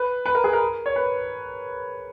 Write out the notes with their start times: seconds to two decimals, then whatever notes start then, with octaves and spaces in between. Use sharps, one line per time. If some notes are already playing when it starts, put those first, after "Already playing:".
Already playing: B4
0.26 B4
0.35 A#4
0.44 G#4
0.53 A#4
0.86 C#5
0.96 B4